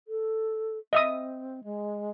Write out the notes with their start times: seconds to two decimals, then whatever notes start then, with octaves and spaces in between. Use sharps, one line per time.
0.08 A4
0.93 C4 D#5 E5 D#6
1.64 G#3